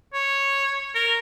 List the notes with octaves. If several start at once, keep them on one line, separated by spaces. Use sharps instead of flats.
C#5
A#4